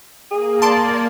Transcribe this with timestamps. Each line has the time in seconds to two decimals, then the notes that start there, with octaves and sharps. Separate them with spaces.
0.31 A#3 G#4
0.62 D5 A5 C6 D7